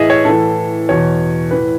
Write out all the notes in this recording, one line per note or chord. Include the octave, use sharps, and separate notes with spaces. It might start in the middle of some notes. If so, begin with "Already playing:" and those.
Already playing: A2 E3 G#4 D#5 E5
C#5
A2 E3 A4
E2 B2 C#5
A2 E3 B4